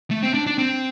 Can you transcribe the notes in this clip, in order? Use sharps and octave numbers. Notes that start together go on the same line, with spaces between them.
A3
C4
D4
D4
C4